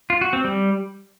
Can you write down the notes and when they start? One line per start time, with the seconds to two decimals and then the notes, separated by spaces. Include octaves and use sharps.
0.10 F4
0.21 F#4
0.33 C4
0.45 G3